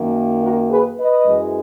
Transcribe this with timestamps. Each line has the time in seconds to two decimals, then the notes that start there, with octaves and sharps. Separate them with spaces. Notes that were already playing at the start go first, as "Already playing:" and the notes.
Already playing: F#2 D#3 A#3
0.41 F#4 A#4
0.70 G#4 B4
0.98 B4 D#5
1.26 F#2 E3 G#3